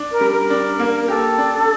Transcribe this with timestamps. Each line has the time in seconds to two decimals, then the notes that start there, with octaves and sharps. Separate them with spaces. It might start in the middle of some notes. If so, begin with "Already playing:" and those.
Already playing: D4
0.12 A#4
0.21 G3
0.30 A#4
0.50 D4
0.79 A#3
1.08 G4 A4
1.38 D4